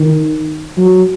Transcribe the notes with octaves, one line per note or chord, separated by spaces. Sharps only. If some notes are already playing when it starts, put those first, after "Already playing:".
Already playing: D#3
F#3